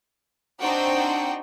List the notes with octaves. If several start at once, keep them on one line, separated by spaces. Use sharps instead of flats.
C4 D4 D#4 F#4 C5 G5